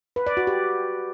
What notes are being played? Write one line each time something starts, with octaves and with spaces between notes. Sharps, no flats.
B4
D5
F#4
G4